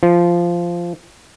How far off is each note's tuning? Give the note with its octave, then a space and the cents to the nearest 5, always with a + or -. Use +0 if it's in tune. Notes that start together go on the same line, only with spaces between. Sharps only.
F3 -10